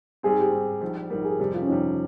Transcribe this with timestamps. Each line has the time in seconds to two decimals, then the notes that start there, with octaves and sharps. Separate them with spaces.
0.23 G#2 G3 C4 G#4
0.38 G4
0.52 G#2 G3 C4
0.81 A#1 G#2 G3
1.10 A#1 G#2 G3 A#4
1.24 G#4
1.39 F2 C3 G3 G4
1.54 F4
1.61 C#4
1.68 F2 C3 G3 D#4